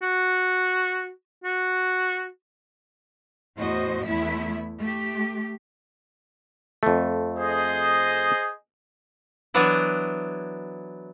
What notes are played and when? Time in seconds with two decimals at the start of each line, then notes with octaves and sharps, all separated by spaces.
0.03 F#4
1.44 F#4
3.56 E2 A2 F#4 C5 D#5
4.05 E2 A3 B3 E4 E5
4.79 A3 G4
6.83 F2 A3
7.36 G#4 C5 D#5
9.54 E3 F#3 B3 D4 E4